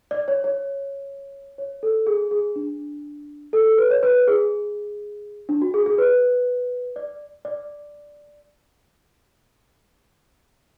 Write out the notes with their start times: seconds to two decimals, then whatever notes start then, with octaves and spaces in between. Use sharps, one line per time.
0.11 D5
0.28 C#5
0.44 C#5
1.58 C#5
1.83 A4
2.07 G#4
2.31 G#4
2.56 D4
3.53 A4
3.66 A4
3.78 B4
3.90 C#5
4.03 B4
4.28 G#4
5.49 D4
5.62 F#4
5.74 G#4
5.86 G#4
5.98 B4
6.96 D5
7.45 D5